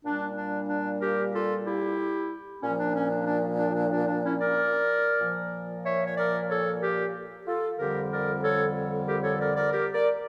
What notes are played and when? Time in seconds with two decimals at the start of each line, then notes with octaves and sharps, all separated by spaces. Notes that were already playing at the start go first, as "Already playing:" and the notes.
0.04 A#2 G3 D4
0.37 D4
0.69 D4
1.01 G4 A#4
1.33 F4 A4
1.66 E4 G4
2.62 A#2 F3 C#4
2.79 D4
2.95 C#4
3.11 D4
3.27 D4
3.59 D4
3.75 D4
3.91 D4
4.08 D4
4.24 C#4 E4
4.40 A#4 D5
5.20 A#2 F3
5.85 C#5 E5
6.07 C#5
6.18 A#4 D5
6.49 A4 C#5
6.82 G4 A#4
7.46 F4 A4
7.78 F2 D3 G3 G4 A#4
8.11 A#4 D5
8.43 A4 C#5
9.07 G4 A#4
9.23 A4 C#5
9.40 A#4 D5
9.56 A#4 D5
9.72 G4 A#4
9.93 A#4 D5